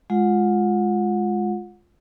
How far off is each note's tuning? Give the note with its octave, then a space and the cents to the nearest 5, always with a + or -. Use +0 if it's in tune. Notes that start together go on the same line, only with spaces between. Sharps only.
G#3 +0 F4 +0 F#5 -25